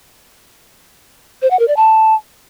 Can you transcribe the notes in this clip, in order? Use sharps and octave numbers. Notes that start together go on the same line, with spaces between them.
C5
F#5
A#4
D5
A5